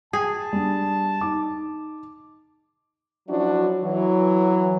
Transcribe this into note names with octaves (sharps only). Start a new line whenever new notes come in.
G#4 G5 A5
G3 D4
D#4 D6
F3 F#3 C#4 D4 E4 F#4
E3 F#3